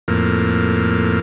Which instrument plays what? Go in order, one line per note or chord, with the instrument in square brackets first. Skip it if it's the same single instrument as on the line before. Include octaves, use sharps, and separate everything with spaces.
[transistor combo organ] F2 A2 A#3